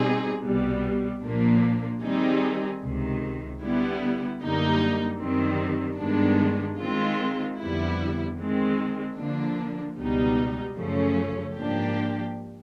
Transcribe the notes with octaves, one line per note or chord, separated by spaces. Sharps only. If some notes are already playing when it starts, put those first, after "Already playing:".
Already playing: B2 G3 C4 D#4 G#4
C2 B2 G3 B3
A#2 F3 A#3 D4
D#3 G3 C4 D#4 G#4
C#2 C3 D#3
D3 G3 B3 E4
F#2 D3 G3 A#3 D#4
F#2 D#3 G3 C4
G2 D#3 G#3 B3 D4
D#3 G#3 C4 F4
F2 D3 G3 B3 E4
D#3 G#3 C4
D3 F3 A#3 D4
C#2 B2 G3 B3 D#4
F#2 C#3 F3 A3 C#4
G#2 F3 A#3 D4 G4